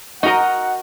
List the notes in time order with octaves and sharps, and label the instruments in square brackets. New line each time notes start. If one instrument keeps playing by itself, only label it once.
[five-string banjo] D#4 A#5 [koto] F#4 A#4 D#5 [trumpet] F#5